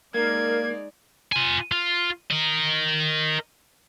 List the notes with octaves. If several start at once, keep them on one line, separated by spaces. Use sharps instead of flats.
G#3 A#3 D#4 A#4 D5 G#6
F4 G#5
F4
A#4 D#5